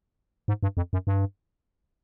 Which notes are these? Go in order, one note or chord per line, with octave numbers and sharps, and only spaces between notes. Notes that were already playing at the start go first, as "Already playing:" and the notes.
G#2
G2
F2
F#2
G2